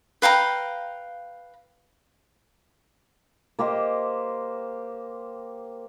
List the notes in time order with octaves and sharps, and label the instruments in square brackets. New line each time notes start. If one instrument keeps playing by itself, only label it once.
[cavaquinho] B4 F5 G5 A#5
[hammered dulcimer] A#3 G4 C5 D#5